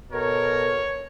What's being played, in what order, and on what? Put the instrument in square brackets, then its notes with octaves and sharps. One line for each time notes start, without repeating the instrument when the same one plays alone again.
[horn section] B2 A4 A#4 [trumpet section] C#5